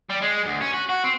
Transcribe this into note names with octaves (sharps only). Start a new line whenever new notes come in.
G3
G#3
D2
C#4
F#4
F#4
C4